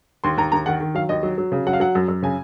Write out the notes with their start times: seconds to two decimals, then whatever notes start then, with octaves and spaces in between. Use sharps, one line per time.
0.24 D#2 C6
0.37 D#2 A#5
0.52 D#2 A#5
0.66 D#3 F#5
0.80 D#3
0.95 F#3 F5
1.09 D#2 D#5
1.23 F#3
1.38 F#3
1.52 C#3
1.67 F#3 F#5
1.73 F5
1.80 F#3 F#5
1.95 F#2
2.08 F#2
2.23 C#3 G#5